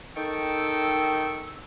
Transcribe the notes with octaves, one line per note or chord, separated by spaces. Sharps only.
D#3 D#4 A4 G5 C#6 E6